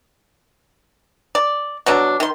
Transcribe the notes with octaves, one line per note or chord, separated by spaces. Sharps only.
D5
B2 F#3 D4
D#3 C6